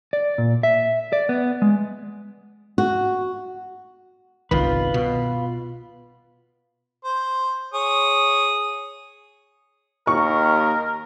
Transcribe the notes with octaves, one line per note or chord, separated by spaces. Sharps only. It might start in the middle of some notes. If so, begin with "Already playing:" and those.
D5
A#2
E5
D5
B3
G#3
F#4
G1 C2 D#3 F4 B4
B2
C5
G#4 C#5 D#6
D#2 A#4 C#6